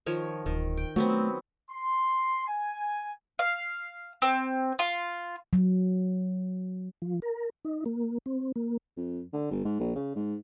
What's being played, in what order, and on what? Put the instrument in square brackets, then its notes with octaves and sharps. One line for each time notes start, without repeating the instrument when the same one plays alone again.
[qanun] D#3 F3 C#5
[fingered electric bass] D1 [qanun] D#3
[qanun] G5
[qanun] F#3 B3 C4 [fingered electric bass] A3
[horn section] C6
G#5
[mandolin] F5
C4
F4
[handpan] F#3
[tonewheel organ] F3
A#4
D#4
A#3
C4
A#3
[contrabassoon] F2
D3
G1
G#2
A#1
C#3
G#2